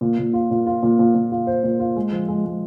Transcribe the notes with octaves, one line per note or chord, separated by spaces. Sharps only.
A#2
A#2
F4
A#2
F4
A#2
A#2
A#2
F4
C5
A#2
F4
G#3
F3
G#3
G#3